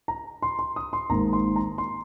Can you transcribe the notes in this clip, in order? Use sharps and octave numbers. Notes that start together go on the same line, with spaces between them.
A#5
C6
C6
D#6
C6
G#1 G#2 D#3 A#3 A#5
C6
A#5
C6